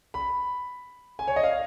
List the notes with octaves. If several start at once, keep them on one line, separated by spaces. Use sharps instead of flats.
B5
G#5
C#5
D#5
F5